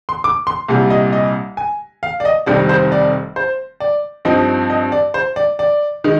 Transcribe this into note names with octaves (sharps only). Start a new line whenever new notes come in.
C6
D6
C6
C2 A#2 G3
D#5
D#5
G#5
F5
D5
D#5
F1 F2 D#3 G3 C4 D5
C5
D5
C5
D5
G2 F3 C4 D#4 D#5
D#5
D5
C5
D5
D5
D#3 G#3 D#4